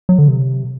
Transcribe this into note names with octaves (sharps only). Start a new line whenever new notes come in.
F#3
D3
C3